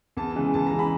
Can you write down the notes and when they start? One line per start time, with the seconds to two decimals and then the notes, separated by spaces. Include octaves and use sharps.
0.17 E2 A5
0.36 C#3 E3 G#3
0.54 E2 A5
0.67 A#5
0.73 C#3 E3 G#3
0.79 B5